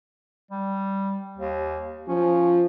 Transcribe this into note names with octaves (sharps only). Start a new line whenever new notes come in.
G3
D#2
F3 C#4